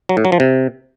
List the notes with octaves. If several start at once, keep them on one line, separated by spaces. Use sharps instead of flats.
F#3
A2
F#3
F3
C3